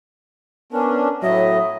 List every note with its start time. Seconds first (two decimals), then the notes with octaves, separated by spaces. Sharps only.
0.72 B3 C#4 D4 A#4
1.23 A2 F#3 D#5 E5